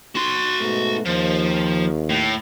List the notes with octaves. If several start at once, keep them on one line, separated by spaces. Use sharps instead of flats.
F#4 C6
G#2 B2 A3
D#2 F3
A2